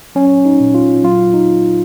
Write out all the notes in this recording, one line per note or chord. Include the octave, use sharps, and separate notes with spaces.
F#3 C#4
D#4
A#2
F4
F#3 F4
D#4